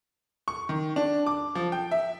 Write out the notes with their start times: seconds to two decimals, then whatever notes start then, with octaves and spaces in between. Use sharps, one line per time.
0.48 C#6
0.69 D#3
0.96 D4
1.26 D6
1.55 F3
1.72 G5
1.91 E5